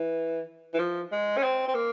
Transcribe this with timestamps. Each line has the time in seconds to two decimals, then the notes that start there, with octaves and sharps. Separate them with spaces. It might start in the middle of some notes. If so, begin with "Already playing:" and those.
Already playing: E3
0.74 E3
0.79 F3
1.12 G#3
1.37 C#4
1.43 C4
1.68 C4
1.74 A#3